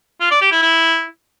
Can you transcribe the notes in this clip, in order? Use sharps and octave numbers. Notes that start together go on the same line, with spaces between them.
F4
D5
G4
E4
E4